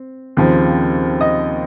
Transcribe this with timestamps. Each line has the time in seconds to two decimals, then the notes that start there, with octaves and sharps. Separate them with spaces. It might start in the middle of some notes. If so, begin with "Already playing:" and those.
Already playing: C4
0.37 D#2 C#3 F3 C4
1.21 D#5